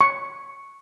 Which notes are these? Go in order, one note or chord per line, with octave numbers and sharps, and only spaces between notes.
C#6